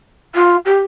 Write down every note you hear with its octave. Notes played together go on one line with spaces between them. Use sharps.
F4
G4